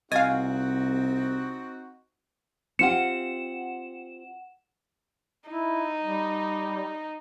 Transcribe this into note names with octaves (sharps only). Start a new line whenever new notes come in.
C2 C4 D#4 F#4 D#5 F5 G#5
C4 F4 G4 F#5 C#7 E7
D#4 E4
G3